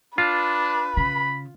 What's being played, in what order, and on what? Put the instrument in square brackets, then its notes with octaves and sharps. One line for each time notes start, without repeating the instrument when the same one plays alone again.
[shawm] D4 [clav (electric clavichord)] F4 [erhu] B4
[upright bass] C#3 [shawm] B5